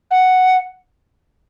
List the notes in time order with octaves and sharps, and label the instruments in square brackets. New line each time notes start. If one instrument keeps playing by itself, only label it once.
[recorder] F#5